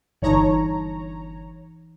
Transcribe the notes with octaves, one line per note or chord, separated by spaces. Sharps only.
G1 E3 D#4 C#5 A5 A#5